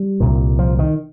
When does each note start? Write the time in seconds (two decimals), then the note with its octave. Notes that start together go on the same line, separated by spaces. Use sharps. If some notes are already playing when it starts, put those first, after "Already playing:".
Already playing: G3
0.20 C2 A#2
0.59 F3
0.79 D#3